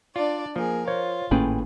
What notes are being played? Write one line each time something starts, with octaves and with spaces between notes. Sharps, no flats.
D4 F4 D5
F3 A#3 G#4 A#4
F4 C5 C#5
G#1 A2 A#3 C#4 G#4 B4 G5 G#5